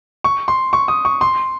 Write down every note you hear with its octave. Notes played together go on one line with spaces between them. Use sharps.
C#6
C6
C#6
D#6
C#6
C6